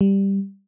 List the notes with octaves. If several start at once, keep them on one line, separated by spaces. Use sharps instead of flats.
G3